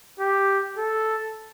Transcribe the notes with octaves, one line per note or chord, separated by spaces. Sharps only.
G4
A4